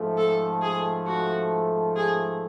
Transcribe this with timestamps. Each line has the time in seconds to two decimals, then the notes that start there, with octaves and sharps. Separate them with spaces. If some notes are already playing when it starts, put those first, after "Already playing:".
Already playing: G#2 F3 A3
0.17 A4
0.62 G#4
1.07 F#4
1.96 G#4